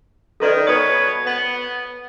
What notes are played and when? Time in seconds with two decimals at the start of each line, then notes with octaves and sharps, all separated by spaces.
0.40 D#3 A4 B4 D5
0.67 B2 B4 C#5 D#6
1.25 B3